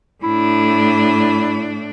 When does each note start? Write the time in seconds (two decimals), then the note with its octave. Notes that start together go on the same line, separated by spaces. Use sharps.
0.23 A2 D4 E4